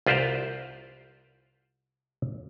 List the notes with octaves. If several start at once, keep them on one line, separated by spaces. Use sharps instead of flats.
C2 F4 B4 C5 D5 A#5